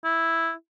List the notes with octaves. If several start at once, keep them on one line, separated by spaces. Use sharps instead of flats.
E4